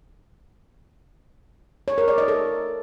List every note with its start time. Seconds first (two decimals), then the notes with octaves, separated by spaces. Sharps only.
1.88 C#5
1.98 A#4
2.08 D5
2.18 D#5
2.28 A4